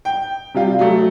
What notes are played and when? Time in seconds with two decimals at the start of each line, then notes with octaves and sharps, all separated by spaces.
0.05 G5
0.54 C3 G3 F4
0.79 F#3 A3